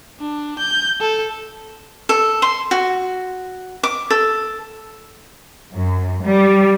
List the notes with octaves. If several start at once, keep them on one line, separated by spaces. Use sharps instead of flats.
D4
G6
A4
A4
C6
F#4
D6
A4
F#2
G3